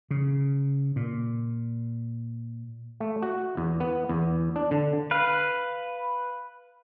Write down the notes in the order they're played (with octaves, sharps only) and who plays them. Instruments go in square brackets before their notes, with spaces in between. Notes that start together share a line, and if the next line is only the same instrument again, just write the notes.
[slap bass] C#3
A#2
[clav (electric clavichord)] A3
F#4
E2
B3
E2
D4
D3
[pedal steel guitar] B4 F5